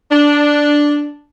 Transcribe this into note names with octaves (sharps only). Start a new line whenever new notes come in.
D4